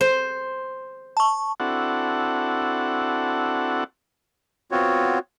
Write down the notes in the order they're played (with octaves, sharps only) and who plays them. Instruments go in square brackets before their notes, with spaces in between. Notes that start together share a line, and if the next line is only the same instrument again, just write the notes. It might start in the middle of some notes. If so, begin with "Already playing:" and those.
[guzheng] C5
[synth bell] A5 C#6
[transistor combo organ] C4 D4 E4 F#4 A4 F#5
[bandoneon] B3 C4 F4 F#4 C#5